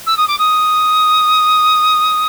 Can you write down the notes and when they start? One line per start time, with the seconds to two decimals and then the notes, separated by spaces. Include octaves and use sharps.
0.06 E6
0.17 D#6
0.28 D6
0.38 D#6